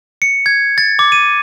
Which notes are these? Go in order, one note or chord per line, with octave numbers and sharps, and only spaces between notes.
C#7
G#6
A6
D6
D#7